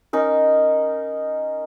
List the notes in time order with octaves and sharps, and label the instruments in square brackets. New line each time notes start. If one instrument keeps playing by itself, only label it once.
[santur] C#4 D#4 A#4